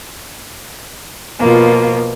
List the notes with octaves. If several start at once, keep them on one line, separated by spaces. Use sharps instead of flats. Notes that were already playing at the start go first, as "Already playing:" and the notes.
B2 F3 A#3 F4